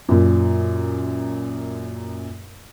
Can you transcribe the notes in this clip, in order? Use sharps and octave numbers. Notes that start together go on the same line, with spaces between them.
F#2 A#2